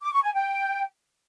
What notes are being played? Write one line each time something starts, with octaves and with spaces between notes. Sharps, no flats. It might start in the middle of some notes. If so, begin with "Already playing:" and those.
D6
C#6
G#5
G5